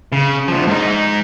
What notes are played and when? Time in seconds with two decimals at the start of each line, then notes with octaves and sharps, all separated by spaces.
0.12 C#3
0.48 D2 F3
0.67 G#2 D#4